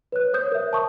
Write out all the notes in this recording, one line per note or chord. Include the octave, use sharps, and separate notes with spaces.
B4 C#5 F#6
C5 C#5 D#6 G6
A#4 E5
A5 C#6 D#6